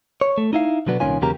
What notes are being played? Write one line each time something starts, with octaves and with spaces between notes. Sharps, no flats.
C#5
A3
D#4 E4 F5
B2 D3 F#3 B3 D4
C2 A#2 D#3 C#4 F4 G#5
E2 C#3 F#3 A#3 G4 A#5